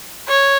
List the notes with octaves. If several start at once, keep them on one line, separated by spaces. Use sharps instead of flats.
C#5